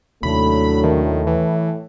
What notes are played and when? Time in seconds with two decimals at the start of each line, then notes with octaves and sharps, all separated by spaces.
0.23 D#2 A2 C3 F#3 A3 D4 B5
0.84 D#3
1.27 E3